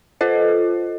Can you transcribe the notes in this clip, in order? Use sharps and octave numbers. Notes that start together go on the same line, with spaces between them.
F4 A4 C5 D#5